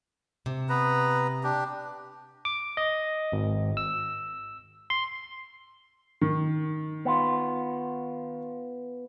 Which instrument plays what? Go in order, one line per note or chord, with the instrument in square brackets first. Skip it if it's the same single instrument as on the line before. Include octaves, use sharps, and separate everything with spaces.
[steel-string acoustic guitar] C3
[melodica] B3 B4 A#5
D4 G4
[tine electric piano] D6
D#5
G#1
E6
C6
[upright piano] D#3
[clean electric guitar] B3 F4